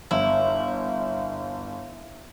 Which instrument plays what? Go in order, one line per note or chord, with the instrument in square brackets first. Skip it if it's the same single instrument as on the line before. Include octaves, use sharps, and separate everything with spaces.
[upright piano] G1 [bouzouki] E4